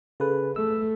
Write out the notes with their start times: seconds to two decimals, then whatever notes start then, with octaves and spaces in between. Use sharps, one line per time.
0.20 C#3 G#4 A4 B4
0.56 A3 E6